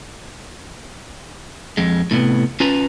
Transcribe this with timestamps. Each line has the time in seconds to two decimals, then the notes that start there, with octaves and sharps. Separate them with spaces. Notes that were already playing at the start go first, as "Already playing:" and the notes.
1.77 F2 G#3
2.11 A2 C3 B3
2.60 C#4 F4 B4 A5 A#5